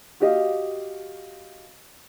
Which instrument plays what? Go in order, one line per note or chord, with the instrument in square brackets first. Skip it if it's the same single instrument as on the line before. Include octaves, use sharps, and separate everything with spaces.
[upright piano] F#4 G4 D#5 F5